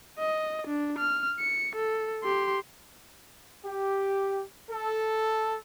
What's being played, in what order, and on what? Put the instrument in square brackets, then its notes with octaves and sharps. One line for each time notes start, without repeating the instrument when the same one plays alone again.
[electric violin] D#5
D4
F6
C#7
A4
G4 C6
[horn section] G4
A4